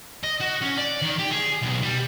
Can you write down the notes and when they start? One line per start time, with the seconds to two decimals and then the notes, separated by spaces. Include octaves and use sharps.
0.24 D#5
0.41 F#4
0.62 C#4
0.78 D5
1.02 D#3
1.19 G4
1.32 G#4
1.63 B1
1.83 G3